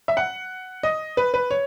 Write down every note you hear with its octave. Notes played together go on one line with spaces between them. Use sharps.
E5
F#5
D#5
B4
B4
C#5